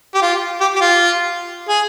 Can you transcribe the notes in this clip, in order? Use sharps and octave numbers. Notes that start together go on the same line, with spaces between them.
G4
F4
G4
G4
F4
G#4